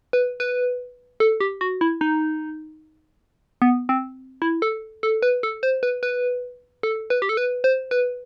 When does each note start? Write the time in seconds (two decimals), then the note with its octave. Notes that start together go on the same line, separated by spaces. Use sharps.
0.13 B4
0.40 B4
1.20 A4
1.41 G4
1.61 F#4
1.81 E4
2.01 D#4
3.62 B3
3.89 C4
4.42 E4
4.62 A4
5.03 A4
5.22 B4
5.43 A4
5.63 C5
5.83 B4
6.03 B4
6.83 A4
7.10 B4
7.22 G4
7.29 A4
7.37 B4
7.64 C5
7.91 B4